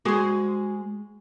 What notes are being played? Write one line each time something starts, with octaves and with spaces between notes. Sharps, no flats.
G#3 F#4 G#4 C5